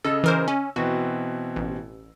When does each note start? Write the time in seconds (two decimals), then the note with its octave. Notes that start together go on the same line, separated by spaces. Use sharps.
0.05 C#3 A4 D#5 E6
0.24 E3 A#4 C5
0.48 C#4
0.76 B2 E3 C4 F#4
1.56 A1